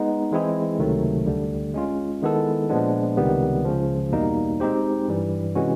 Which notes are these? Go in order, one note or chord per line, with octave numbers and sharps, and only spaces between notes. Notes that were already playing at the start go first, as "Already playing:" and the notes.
Already playing: G#3 B3 D#4
E3 G#3 C4 E4 G#4
C#2 C3 D#3 F#3 A3
D2 D3 G3
G#3 C#4 F4
D#3 G#3 B3 E4 A4
A#2 F3 G#3 B3 D4
C#2 C3 D#3 G3 B3
C#2 C#3 F3
E2 B2 G3 A#3 D#4
G#3 C4 D#4 G4 C5
G2 E3 G3
C3 E3 G#3 C#4 F#4